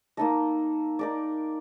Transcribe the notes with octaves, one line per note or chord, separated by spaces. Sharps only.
A#3 D#4 A4 D#5
D#4 A#4 D5